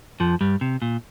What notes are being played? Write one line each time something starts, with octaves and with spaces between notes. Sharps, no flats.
F2 F3
G2 G3
C3
A#2